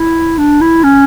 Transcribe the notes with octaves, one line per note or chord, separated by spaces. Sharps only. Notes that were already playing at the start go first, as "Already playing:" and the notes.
Already playing: E4
D4
E4
C#4